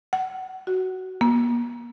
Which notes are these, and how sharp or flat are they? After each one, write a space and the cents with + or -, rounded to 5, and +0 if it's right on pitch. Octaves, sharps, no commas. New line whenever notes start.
F#5 +25
F#4 +10
A#3 +45